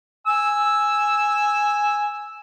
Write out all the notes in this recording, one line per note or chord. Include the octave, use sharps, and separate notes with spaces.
G#5 E6